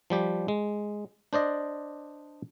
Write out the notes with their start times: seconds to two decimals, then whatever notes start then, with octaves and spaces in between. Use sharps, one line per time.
0.10 F3 G3 G4
0.48 G#3
1.33 D4 C5 D5 D#5